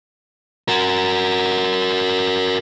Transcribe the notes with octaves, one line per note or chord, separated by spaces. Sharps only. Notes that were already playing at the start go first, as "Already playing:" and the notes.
F#4 A#4